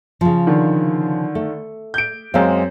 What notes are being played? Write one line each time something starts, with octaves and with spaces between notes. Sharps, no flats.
C#3 F3
D3 D#3
A3
G6 D7
F#2 G#3 C4 F5